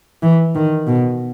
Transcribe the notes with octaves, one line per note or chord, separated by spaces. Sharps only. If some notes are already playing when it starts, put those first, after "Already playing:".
E3
D#3
B2